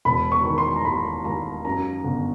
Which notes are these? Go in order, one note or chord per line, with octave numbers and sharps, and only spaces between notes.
E1 B5
C#6
D#3
C6
A#5
D#2 B5
D#2 A#5
F#2 A#5
G1